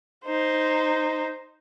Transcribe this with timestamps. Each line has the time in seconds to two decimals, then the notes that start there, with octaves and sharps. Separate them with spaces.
0.25 D#4 C5